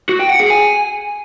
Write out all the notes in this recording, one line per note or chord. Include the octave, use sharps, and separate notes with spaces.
F#4
G5
F#5
G#4
G#5